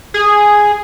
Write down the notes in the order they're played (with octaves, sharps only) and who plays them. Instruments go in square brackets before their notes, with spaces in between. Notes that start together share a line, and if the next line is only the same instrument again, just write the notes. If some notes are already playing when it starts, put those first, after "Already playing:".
[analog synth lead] G#4